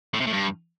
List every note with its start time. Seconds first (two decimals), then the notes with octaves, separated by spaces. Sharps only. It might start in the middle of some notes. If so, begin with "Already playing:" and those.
0.14 A2
0.20 C3
0.27 A2
0.33 G2